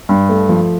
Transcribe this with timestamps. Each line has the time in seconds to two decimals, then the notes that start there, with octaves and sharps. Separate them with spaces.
0.09 G2
0.29 A3
0.49 F3